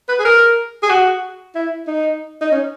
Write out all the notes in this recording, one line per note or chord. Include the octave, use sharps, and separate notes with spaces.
B4
G#4
A#4
G#4
F#4
E4
D#4
D#4
C#4